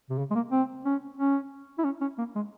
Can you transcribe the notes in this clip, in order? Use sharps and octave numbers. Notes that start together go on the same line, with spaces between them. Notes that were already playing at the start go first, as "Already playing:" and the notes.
C3
C#3
G#3
A#3
C4
C#4
C#4
E4
C#4
C#4
A#3
G#3